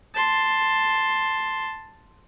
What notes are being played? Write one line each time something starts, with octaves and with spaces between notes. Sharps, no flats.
A5 C6